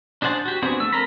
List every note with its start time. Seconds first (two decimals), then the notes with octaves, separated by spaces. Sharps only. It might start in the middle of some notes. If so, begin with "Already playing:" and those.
0.22 D4 G#4 C5 F#5 A5
0.45 F#4 G4
0.62 B3 C4 D4 F#4 G#4
0.80 A3 E6
0.93 C4 A4 A#4 A#5 B5